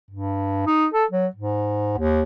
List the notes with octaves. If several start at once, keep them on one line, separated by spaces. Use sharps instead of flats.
G2
D#4
A4
F#3
G#2
D#2